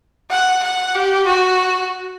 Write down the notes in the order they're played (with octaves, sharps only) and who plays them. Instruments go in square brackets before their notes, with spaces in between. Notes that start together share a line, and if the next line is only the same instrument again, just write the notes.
[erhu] F#5
F#5
G4
F#4